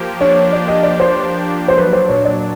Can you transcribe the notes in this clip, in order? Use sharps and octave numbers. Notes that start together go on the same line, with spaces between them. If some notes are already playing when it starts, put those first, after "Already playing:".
Already playing: F3 A#3 G4
D4 C#5
A#3 D5
D#5
G4 D5
C5
F3
D4
C5
F#3 B4
C5
A#2 C#5
D5